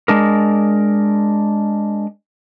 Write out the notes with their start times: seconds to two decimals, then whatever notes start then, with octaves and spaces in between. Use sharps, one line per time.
0.08 G#3 D4 A#4